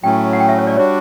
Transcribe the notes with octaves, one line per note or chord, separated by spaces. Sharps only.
A2 F#3 A3 C#4 G5
F#5
G5
E5
C#5
D5
G3 D4 F#4 C#5